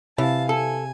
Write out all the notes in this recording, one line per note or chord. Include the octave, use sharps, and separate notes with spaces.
C3 E3 F5 A5
A4 G#5